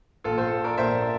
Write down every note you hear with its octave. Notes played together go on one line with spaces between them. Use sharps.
A#1 A#2 F4 A4
A4 C5
A#4 D5
A#1 A#2 C5 E5